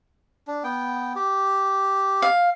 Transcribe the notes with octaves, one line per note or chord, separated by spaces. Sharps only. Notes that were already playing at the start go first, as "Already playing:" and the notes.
D4
B3 G5
G4
F5